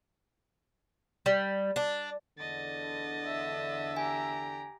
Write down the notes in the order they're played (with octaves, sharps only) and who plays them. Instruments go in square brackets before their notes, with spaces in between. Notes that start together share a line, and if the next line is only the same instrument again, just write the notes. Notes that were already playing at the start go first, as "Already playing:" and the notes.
[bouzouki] G3
D4
[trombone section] E2 D3 [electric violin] D#5 A6
[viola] E5
[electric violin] G4 A#5 [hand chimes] G#5